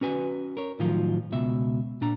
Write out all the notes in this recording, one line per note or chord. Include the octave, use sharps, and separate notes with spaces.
C#4 F#4 B4 G#5
A#4 C#5
A2 D#3 F3 F#3 F4
C#2 B2 E5
A#2 D4 A#5